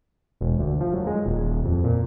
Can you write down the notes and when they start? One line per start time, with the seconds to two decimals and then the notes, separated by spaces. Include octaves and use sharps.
0.41 E1
0.59 D2
0.80 F3
0.94 F#2
1.07 G#3
1.26 D#1
1.65 F2
1.84 A#2